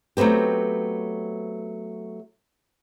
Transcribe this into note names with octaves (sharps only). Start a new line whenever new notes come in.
F#3 A3 B3 C4 G4